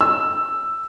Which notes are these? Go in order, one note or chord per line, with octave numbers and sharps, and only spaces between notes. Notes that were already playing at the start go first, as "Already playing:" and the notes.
E6